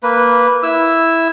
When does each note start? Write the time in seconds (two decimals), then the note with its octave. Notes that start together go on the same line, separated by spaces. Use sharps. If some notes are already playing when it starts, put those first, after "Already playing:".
0.03 A#3 B4
0.63 E4 E6